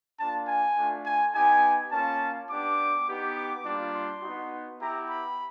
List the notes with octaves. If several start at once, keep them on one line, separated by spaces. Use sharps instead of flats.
A#3 D4 F4 A5
G#5
A3 D4 F4
G#5
B3 D#4 G4 G#5
A#3 C#4 F4 A5
B3 D4 G4 D6
B3 D#4 G4
D6
G3 A#3 D4 F4
C6
B3 D#4 F#4
B3 E4 G4 A#5
B5